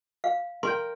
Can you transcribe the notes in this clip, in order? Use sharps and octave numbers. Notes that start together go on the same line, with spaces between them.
F5
A#4 G5 C6